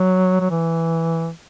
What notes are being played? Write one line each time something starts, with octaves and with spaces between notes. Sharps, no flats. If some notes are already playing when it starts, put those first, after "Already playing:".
Already playing: F#3
F#3
E3